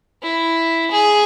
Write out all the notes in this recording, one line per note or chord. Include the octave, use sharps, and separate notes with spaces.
E4
G#4